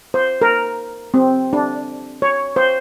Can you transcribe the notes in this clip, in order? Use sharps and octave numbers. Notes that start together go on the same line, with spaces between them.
C5
A#4
C4
D4
C#5
C5